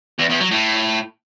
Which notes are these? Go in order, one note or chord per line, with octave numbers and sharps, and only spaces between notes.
E2
E2
F#3
A2